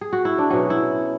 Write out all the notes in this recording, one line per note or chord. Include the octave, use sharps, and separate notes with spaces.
G#4
F#4
E4
D4
B2 F#3 C#4
E4